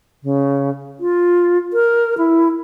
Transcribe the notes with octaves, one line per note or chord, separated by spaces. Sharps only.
C#3
F4
A#4
E4